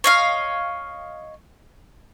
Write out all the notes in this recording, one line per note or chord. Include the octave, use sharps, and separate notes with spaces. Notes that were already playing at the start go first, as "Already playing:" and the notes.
C#5 D#5 F5